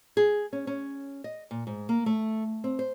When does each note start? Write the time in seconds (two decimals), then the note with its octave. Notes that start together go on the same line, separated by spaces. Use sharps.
0.17 G#4
0.53 C#4
0.67 C#4
1.24 D#5
1.51 A#2
1.67 G#2
1.89 A#3
2.06 A3
2.64 C4
2.79 C5